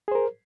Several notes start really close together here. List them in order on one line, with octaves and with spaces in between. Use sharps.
G#4 C5 A#4